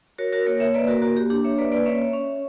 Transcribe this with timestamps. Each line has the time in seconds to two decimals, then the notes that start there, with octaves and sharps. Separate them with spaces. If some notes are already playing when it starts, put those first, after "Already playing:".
0.18 F#4 A#4 C#5
0.33 F#4 A#4
0.46 A#3 A#4 C#5
0.60 C#5 E5
0.74 A#3 B4 D5
0.88 F#4 A#4
1.02 A#3 F#4 A#4
1.17 G4
1.30 D4 G4
1.44 C#5 E5
1.58 A#3 B4 D5
1.72 B4 D5
1.86 C#4 C#5 E5
2.13 C#4